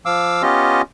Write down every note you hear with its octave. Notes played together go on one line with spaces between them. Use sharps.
F3 F5 D6 E6
B3 C#4 F4 G4 D#5